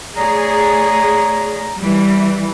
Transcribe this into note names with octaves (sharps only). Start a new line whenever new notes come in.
A3 G#4 C#5 D5 A#5
E3 G3